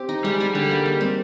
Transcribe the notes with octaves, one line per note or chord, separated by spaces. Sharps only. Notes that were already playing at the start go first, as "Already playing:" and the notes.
Already playing: C4 G4
D#4
G3 G#3
G#4
D3 G3
A#3
D#4
C4